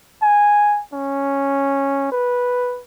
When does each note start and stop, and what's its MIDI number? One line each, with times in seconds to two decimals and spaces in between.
0.22 0.81 80
0.93 2.10 61
2.12 2.81 71